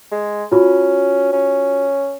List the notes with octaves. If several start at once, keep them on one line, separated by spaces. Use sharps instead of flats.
G#3
C#4 F4 F#4
C#4